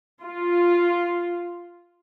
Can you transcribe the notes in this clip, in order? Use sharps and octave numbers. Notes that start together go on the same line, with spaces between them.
F4